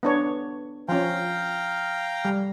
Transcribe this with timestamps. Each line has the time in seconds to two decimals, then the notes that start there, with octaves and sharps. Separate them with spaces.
0.03 B3 D4 C#5
0.89 F3 C#4 F5 G5 A#5
2.25 G3